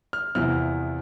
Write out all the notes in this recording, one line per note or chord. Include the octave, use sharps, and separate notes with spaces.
F6
E2 C3 F3 B3 E4 F6